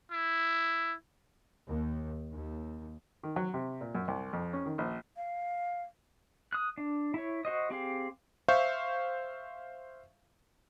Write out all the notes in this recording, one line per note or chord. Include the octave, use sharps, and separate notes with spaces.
E4
D#2
D#2
D#3
F#3
C3
A#2
F#2
C2
F2
C#4
D#3
A#1
F5
D#6 F#6
D4
E4 C#5
F#4 C5 D#5
C4 G4 G#4 F5
C5 E5 F5 C#6 G6